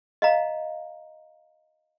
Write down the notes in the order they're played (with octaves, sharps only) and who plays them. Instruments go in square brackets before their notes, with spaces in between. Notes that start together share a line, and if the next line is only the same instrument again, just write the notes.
[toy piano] D#5 F5 A#5